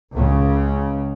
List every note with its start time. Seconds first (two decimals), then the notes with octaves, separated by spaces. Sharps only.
0.14 C#2 C#3